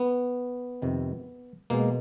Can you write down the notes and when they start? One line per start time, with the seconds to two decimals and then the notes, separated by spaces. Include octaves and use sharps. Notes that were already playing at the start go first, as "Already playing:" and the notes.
Already playing: B3
0.82 F2 C3 D#3
1.70 B2 G#3 A#3